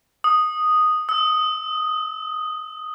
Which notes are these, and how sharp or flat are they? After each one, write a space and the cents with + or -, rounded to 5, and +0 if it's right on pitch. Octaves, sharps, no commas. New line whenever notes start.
D#6 -5
E6 -45